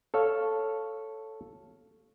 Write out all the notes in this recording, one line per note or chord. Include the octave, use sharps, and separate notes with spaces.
A4 C#5 F5